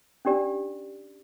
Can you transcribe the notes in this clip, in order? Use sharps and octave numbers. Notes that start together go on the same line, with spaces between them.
C#4 D4 G4 D5